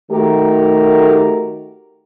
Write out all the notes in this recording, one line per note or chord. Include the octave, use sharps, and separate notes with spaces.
D#3 A3 F#4 G4 A#4